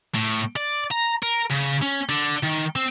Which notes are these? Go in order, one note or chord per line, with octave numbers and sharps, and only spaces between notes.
A2
D5
A#5
A#4
C#3
C#4
D3
D#3
C4